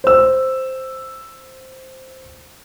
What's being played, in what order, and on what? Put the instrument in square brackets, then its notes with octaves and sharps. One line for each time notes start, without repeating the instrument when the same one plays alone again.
[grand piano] C5 E6